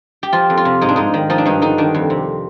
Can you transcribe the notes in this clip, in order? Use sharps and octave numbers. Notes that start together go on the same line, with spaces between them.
G4
F3 F4
F2
F4
C3
G#2 D#4
D4
G#2 D#4
D#3
F3 D#4
D4
G2 D#4
D3 D#4
D#3 D4
F2
C3